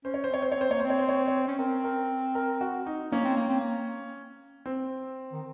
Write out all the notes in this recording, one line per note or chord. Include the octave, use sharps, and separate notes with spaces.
C#4 C5
C#5
C5
C4 C#5
C5
C4 C#5
C5
A#3 C#5
C4 C5
C#5
C5
C#5
C5
C#5
C5
C#4
C4 A#4
A#4
A#4
F#4
D#4
A#3 C#4
C4
A#3
C4
A#3
C4
D#3